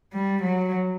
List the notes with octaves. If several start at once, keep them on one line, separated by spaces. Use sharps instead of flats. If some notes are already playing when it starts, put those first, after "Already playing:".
G3
F#3